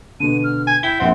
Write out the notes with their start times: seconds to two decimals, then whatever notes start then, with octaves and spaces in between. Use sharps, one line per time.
0.20 B2 D3 D#7
0.44 F6
0.67 G#5 G#6
0.83 E4 G5 G7
1.00 A#1 C4 F#5